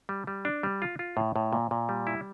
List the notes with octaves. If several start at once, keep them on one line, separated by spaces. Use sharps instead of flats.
G3
G3
D4
G3
F4
F4
A2
A2
A#2
A#2
G3
E4